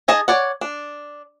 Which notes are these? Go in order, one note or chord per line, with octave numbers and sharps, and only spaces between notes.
D#4 G#4 D#5 A5
C#5 D5 F#5
D4